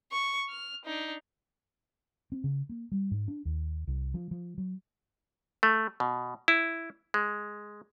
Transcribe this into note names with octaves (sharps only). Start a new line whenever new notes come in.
C#6
F6
D4 D#4
C4
C#3
A#3
G3
G#2
D4
D#2
C2
F3
F3
F#3
A3
B2
E4
G#3